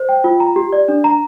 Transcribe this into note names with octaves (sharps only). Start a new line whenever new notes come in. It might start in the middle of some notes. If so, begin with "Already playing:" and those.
Already playing: C5
G5
F4
A#5
G4
D5
D4
A#5